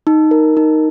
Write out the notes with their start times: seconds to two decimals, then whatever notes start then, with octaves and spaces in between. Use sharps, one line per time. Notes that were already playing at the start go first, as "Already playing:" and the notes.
0.07 D#4
0.31 A#4
0.57 D#4